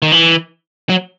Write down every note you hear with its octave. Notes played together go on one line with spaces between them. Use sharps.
D#3
E3
F#3